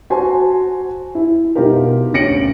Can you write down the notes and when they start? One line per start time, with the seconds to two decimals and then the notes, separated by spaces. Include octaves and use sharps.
0.10 F#4 C5 G#5 A5 C6
1.15 E4
1.55 B2 D#4 F4 G4 A#4
2.13 D2 C#4 A#6 C#7 D7 F#7